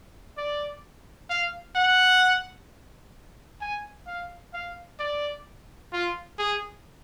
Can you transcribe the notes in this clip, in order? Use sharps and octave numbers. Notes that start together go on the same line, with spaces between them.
D5
F5
F#5
G#5
F5
F5
D5
F4
G#4